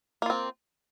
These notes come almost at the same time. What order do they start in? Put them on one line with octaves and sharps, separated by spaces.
A#3 F4 C4